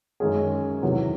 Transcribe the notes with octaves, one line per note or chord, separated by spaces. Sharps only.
F#2 D#3 G#3 C#4 G#4
E2 C3 D#3 F#3